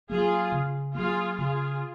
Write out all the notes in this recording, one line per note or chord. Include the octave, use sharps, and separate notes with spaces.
F#3 A#3 F4 G#4
C#3
F#3 A#3 F4 G#4
C#3 F4 G#4